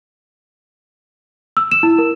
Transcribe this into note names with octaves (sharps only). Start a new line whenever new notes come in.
E6
E7
E4
A#4